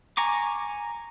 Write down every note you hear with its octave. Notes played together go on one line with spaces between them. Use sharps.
G#5 A#5 C#6 D6